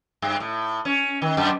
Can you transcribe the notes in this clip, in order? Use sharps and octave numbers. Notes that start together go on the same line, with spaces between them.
G2
A2
C#4
D#3
F#2